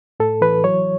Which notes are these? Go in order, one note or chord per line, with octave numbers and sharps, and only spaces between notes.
A2 A4
E3 B4
F#3 C#5